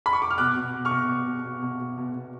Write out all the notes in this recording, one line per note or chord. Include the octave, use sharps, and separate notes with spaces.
B5
C#6
D6
F6
B2 D6 F#6
B2
B2
C#6 F6
B2
B2
B2
B2
B2
B2
B2
B2